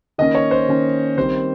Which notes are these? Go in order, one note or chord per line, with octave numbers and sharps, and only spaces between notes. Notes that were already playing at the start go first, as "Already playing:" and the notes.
D#3 A#3 C#4 D#5
C#5
C5
D#3 A#3 C#4
D#3 G3 C4 C5